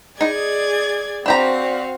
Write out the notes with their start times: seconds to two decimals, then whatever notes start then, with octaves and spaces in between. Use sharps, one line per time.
0.21 D#4 G#4 D5 D#5 G#6
1.26 C4 D4 F#4 G4 F5 A#5